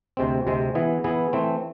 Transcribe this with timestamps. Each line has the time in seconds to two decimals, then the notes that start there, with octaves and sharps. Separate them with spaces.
0.17 D2 C3 G#3 C4
0.46 D2 C3 G#3 C4
0.75 E3 B3 E4 G#4
1.04 E3 B3 E4 G#4
1.33 E3 A3 C4